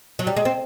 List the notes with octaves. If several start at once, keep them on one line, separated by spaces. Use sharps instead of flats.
F#3
G3
G#3
C4